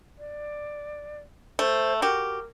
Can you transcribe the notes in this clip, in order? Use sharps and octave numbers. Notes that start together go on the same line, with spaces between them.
D5
A3 C5
F#4 G4 A#4